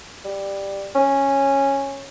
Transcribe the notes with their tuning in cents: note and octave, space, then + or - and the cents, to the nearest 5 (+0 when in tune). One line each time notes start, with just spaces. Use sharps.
G3 +10
C#4 -10